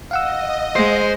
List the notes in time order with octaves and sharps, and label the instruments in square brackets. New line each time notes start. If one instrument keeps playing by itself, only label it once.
[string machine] D#5 [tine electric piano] F5 F#5 E6
[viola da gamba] G#3 [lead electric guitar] C5